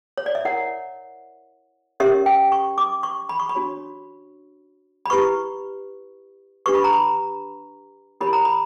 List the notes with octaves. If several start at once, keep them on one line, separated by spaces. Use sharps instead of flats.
C#5
D5
E5
E4 A#4 C#5 F#5
C#4 G4 A#4 C#5 E5
G5
C#6
D6
C#6
B5
C#6
B5
D4 F#4 C#5
B5
E4 G4 B4 C#6
D4 G4 B4 C#6
B5
A#5
B5
E4 G4 A#4 C#5 B5
A#5
B5